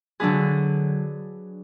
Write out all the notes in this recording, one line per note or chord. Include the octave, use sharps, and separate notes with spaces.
D3 F#3 D4 G#4 B4